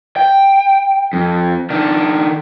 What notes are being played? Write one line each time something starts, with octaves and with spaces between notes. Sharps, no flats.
G5
F2
D#3 D4